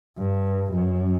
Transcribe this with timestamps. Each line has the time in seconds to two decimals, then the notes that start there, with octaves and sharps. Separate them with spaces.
0.18 G2
0.73 F#2